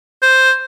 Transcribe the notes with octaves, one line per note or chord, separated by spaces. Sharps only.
C5